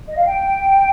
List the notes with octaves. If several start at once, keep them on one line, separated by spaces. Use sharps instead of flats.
D#5
F5
G5